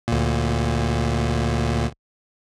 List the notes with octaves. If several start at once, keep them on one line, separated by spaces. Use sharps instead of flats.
D2 A#2